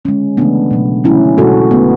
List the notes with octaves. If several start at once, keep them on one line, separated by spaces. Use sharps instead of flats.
D3 G#3 C#4
C#3 E3 A3 B3 D4
B2 F#3 A3
D3 F#3 A3 C#4 E4
B2 G#3 F#4 A4
D3 A3 B3